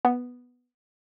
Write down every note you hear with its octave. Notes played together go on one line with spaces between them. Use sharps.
B3